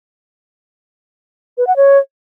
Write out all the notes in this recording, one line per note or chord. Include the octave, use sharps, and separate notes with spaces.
B4
F#5
C#5